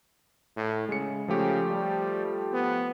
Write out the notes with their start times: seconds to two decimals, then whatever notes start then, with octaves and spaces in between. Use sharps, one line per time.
0.57 A2
0.89 C#3 G#3 C#7
1.28 C#3 F3 A3 G4
1.70 G3
2.53 B3